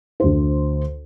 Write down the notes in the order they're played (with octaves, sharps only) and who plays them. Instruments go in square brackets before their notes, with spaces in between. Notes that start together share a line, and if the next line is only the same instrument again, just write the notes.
[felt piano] D2 C5